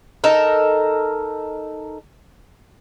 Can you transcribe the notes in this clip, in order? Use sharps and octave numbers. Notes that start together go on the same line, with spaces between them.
D#4 A4 A#4